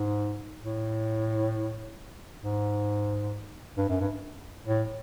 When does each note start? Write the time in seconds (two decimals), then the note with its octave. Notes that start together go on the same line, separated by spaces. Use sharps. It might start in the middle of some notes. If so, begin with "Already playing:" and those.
Already playing: G#2
0.62 A2
2.42 G#2
3.78 G2
3.89 F#2
4.00 G2
4.67 A2